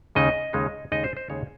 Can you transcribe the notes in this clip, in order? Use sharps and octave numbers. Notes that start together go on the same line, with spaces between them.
D#2 C#3 G#3 D#4 D#5
D#2 C#3 G#3 D#4
D#2 C#3 G#3 D#4 D#5
C5
C5
D#2 C#3 G#3 D#4 C#5